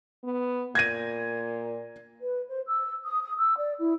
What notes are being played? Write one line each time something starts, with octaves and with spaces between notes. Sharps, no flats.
B3
A#2 G#6 A#6 D#7
B4
C5
E6
D#6
D#6
E6
D5
E4